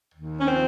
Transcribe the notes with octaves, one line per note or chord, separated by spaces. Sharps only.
D#2
C#4
F3 C4